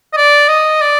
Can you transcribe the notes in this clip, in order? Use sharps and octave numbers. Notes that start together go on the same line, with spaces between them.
D#5
D5
D#5
D5